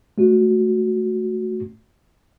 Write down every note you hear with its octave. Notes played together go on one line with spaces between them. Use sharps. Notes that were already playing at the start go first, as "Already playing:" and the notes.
A3 F#4